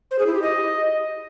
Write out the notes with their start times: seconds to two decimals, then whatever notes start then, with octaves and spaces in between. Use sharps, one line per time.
0.11 C5
0.19 G#4
0.27 E4
0.34 G4
0.42 D#5